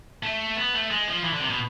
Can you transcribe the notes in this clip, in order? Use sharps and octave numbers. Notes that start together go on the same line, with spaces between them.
A3
B3
A3
G#3
F3
E3
D3
C3
B2